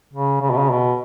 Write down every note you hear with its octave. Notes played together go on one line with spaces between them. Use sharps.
C#3
C#3
B2
C#3
B2